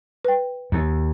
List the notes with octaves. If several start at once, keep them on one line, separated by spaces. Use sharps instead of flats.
B4 G5
D#2